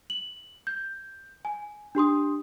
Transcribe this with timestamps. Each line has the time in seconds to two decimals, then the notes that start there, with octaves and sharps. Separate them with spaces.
0.10 F#7
0.67 G6
1.45 G#5
1.95 D4 G4 C6 D#6